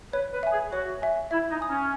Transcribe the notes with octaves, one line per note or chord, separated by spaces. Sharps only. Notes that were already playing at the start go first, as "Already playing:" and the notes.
B4 C#5
B4
E5 G#5
G#4
F#4 C#5
E5 G#5
E4 E5
D#4
G#5 D#6
C#4